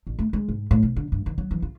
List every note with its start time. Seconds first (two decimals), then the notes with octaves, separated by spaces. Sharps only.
0.07 A1
0.19 A3
0.33 G#3
0.49 G#2
0.71 A2
0.83 B1
0.96 D3
1.12 G2
1.26 D#3
1.38 F#3
1.51 E3
1.62 F4